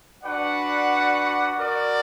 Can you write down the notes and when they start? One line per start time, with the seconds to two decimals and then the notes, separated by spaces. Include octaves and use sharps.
0.22 D4 F#4 B4 D5 F#5
1.54 F#4 A#4 D5